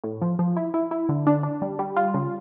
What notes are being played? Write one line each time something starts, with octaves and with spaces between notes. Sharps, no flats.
A2
F3
F3
E4
E4
E4
D3
D4
D4
G3
G3
F4
C#3